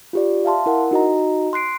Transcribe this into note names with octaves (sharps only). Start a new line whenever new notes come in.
F4 G4 D5
E5 F5 A5 C6
E4 A#4 F#5
D#4 F#4 D#5 A#5
C6 F#6 C7 D7